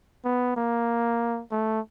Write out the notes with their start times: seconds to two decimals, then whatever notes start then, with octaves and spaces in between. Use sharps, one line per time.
0.25 B3
0.56 A#3
1.51 A3